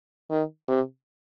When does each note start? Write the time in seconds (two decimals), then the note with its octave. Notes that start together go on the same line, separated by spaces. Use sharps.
0.31 D#3
0.68 C3